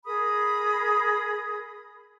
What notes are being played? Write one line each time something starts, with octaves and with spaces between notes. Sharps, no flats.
G#4 A#4 B5 D#6